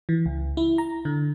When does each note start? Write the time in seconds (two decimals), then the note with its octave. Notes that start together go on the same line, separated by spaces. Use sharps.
0.09 E3
0.26 C#2
0.57 E4
0.78 A#5
1.05 D3